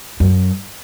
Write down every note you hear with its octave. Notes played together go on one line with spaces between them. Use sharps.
F#2